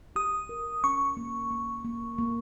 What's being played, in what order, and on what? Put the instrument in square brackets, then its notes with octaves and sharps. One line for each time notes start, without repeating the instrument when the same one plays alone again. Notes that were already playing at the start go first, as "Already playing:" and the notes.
[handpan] G4 [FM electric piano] D#6
[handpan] A#4
[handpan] C#4 [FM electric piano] C#6
[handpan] A#3
A#3
A#3
A#3